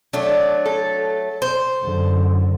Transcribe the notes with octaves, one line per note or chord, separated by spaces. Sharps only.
F#3 A3 D4
A4
C5
F#2 D3